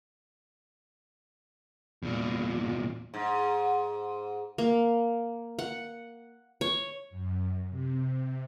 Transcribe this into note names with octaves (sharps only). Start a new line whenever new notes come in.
E2 A#2
G#2
A#3
F#5
C#5
F#2
C3